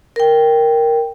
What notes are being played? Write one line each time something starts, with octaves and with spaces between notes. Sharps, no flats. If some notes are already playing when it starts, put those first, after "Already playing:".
A#4 G5